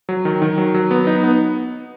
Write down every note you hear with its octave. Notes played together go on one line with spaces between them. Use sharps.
F#3
D#3
D#3
F#3
F#3
B3
D#4
B3